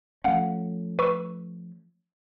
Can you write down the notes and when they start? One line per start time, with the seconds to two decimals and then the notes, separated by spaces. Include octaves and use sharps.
0.24 F3 A3 C#4 F5 F#5
0.99 B4 C#6 E6